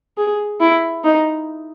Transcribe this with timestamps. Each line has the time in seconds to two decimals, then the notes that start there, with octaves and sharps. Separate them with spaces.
0.18 G#4
0.60 E4
1.04 D#4